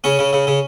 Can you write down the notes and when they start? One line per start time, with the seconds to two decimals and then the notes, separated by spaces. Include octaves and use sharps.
0.04 C#3 C#4
0.19 C#3
0.33 C#3
0.47 C#3